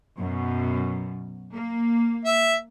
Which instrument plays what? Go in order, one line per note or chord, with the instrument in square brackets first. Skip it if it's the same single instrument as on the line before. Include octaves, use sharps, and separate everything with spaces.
[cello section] F#2 B2
A#3
[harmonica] E5